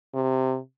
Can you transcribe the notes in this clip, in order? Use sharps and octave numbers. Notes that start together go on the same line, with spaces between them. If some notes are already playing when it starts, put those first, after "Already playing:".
C3